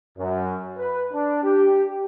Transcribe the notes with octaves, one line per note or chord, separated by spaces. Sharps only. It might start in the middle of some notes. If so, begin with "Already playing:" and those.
F#2
B4
D4
G4